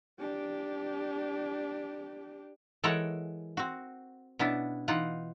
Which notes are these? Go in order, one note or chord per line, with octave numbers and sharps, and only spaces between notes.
D4 G4
E3 G#3 A4 A#4 C#5 F#5
C4 F#4
B2 B3 C#4 D4 E4
E3 D#4 F4 F#5